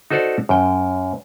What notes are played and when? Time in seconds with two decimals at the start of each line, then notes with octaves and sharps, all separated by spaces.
0.10 D#4 F#4 A4 C5 D5
0.49 F#2 G5